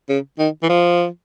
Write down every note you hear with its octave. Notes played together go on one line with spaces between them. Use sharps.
C#3
D#3
E3
F3